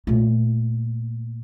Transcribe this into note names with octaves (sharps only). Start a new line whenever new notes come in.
A#2 A3